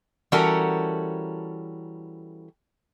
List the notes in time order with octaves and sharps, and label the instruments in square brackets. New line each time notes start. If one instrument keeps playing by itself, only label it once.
[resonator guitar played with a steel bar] E3 G3 C#4 F#4 A4 A#4